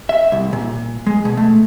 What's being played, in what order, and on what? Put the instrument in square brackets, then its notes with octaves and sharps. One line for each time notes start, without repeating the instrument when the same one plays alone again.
[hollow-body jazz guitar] E5
C2
A#2
G#3
B2
A3